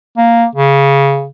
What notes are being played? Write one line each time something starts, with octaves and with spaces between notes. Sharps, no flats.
A#3
C#3